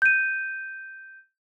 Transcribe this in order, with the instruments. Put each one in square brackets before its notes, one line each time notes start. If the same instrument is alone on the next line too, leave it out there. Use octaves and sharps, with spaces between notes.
[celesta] G6 D#7